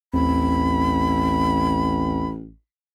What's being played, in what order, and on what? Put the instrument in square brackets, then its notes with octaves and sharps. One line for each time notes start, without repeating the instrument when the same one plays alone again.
[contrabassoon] A1 [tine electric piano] D#2 C4 [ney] B5